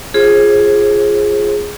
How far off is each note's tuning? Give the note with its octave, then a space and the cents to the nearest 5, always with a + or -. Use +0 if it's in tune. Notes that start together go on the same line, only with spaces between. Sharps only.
F4 +0 G#4 +0 C5 +35